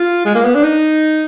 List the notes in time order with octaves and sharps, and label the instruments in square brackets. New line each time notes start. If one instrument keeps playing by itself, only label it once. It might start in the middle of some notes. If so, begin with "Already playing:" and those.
Already playing: [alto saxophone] F4
G#3
A#3
B3
D4
D#4